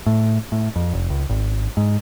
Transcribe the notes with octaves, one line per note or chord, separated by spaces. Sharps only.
A2
A2
F2
F1
C#2
G#1
G#2